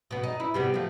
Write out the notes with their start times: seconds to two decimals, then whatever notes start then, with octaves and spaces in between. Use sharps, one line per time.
0.11 B2 B3
0.23 D#4
0.40 E4
0.54 C3 G3 B3
0.74 F3 A3